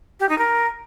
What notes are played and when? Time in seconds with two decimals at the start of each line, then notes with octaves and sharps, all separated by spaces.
0.20 G4
0.29 D#4
0.38 A#4